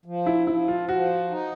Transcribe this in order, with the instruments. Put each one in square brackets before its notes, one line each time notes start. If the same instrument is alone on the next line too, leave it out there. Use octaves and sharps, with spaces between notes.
[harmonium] F3
[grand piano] E4
[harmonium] F3 [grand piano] E4
[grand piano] F4
[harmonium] F3 [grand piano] F#4
[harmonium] D#4